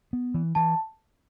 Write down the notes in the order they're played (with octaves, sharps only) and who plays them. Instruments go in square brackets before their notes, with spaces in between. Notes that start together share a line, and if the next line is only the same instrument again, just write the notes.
[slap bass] B3
E3
[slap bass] E3 [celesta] A5